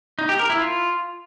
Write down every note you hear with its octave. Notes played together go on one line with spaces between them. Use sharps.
D#4
G4
A#4
E4
F4